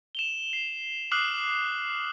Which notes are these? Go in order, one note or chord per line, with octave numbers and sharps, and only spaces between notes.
E7 F7 G7
C7
D6 D#6 F6 F#6 C7 F#7